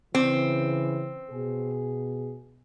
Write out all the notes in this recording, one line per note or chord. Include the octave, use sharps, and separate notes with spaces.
C#3 E3 C4
B2 G#4